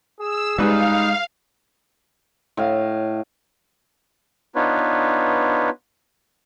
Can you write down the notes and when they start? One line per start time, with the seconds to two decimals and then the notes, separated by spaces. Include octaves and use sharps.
0.19 G#4 E6
0.59 C#2 G3 G#3 D#4 B4 F5
2.57 A2 D#5 F5
4.55 B3 D4 D#4 F4 B4 C#5